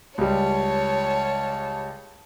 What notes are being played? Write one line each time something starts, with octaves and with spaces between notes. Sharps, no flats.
C#2 G3 C#5 A5